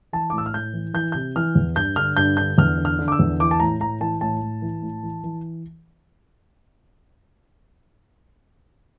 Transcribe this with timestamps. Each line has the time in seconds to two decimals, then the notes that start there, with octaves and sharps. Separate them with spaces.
0.13 E3 A5
0.30 D6
0.33 A2
0.38 E6
0.46 F6
0.54 A2 G6
0.73 E3
0.94 E3 G6
1.12 C3 G6
1.36 E3 F6
1.55 E2
1.76 G2 G6
1.96 D3 F6
2.17 G2 G6
2.37 D3 G6
2.58 E2 F6
2.78 D3
2.85 F6
2.99 D3
3.08 D6
3.12 E6
3.19 E2
3.40 E3 D6
3.51 A5
3.60 A2 A#5
3.80 A2 A#5
4.01 E3 A5
4.21 A2 A5
4.42 A2
4.62 E3
4.82 A2
5.03 E3
5.24 E3